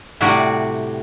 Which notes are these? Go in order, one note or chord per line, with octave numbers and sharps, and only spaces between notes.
A2 C3 G3 F#4 D5